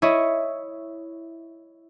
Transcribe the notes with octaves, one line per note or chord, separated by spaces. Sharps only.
E4 C#5 D#5